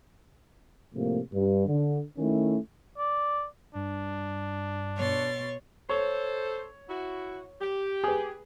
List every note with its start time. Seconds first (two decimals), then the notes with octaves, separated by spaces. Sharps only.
0.92 A2 C3 F3 A#3
1.32 G2
1.67 D3
2.17 D#3 A3 C#4 E4
2.98 D5
3.75 G2 D4
4.97 B2 C#5 C6 A6
5.89 A4 C5 C#5
6.89 E4 F#4
7.61 G4
8.04 G#4 B4